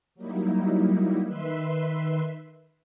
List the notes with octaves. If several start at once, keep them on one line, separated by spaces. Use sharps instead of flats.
F#3 G3 A#3 D#4 E4
D#3 B4 E5 C6